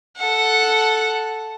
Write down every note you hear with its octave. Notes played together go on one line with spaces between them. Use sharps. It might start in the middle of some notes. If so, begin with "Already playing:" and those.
A4 F#5